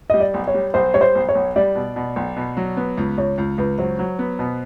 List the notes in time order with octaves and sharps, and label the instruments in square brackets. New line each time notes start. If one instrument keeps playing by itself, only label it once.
[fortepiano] G3 [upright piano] D#5
[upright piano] D5
[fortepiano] B1
[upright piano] C#5
[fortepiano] G3
[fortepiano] B1 [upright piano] C5
[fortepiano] G3 [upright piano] C#5
[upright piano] C5
[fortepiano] B1
[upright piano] C#5
[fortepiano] B1
[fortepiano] G3 [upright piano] D5
[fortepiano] B2
B2
B1
B2
F#3
B3
C#2
[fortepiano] C#2 [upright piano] C#5
[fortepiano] C#2
[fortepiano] C#2 [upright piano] B4
[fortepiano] F#3 [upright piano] C5
[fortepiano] F#3
B3
B2